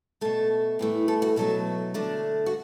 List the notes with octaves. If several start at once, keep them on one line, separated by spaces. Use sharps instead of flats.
B2 A3 A4
A2 E3 A3
A4
F#4
B2 F#3 A3 A4
D3 A3 D4
F#4